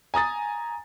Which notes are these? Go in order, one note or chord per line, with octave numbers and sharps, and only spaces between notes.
G#5 A#5 D#6 A6